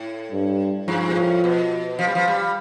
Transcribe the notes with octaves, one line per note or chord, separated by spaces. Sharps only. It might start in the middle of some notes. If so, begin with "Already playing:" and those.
Already playing: A2
G2
G2 F3
B2
A2
B2
F3
G3
F3
G3